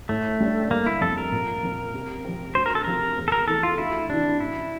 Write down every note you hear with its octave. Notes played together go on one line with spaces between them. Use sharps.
A2 A3
G3 D4
G1 A#3
E4
F2 C3 A4
A#4
A#2
F3 C4
C3
F3 C4
D2 C5
A#4
A4
C3 F3 C4 F4 A#4
E2
A4
A#4
E3 A3 A4
F4
D2 E4
C3 E3 D4
A1 E4